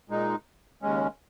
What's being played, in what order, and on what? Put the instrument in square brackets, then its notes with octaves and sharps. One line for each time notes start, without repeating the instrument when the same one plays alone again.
[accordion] A#2 G#3 D#4
D#2 C#3 G#3 C#4